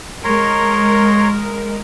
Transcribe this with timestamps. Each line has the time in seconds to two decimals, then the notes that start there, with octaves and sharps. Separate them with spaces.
0.24 G#3 A#4 C#5 A#5 C6